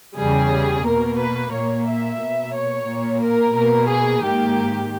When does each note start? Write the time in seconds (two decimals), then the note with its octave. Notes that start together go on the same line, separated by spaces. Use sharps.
0.17 E2 C#3 G3 G#4
0.85 B2 A#3 A#4
1.19 B4
1.52 A#2 A#3 C#5
1.87 E5
2.20 B2 A#3
2.54 C#5
2.87 A#2 A#3
3.22 A#4
3.55 B2 A#3 A#4
3.88 G#4
4.23 G#2 D#3 A#3 G4